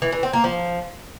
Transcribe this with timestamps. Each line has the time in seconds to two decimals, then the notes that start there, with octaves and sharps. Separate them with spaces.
0.02 E3
0.12 E3
0.23 C4
0.33 A#3
0.44 F3